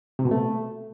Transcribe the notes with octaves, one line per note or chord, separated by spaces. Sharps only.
C3
B2
A3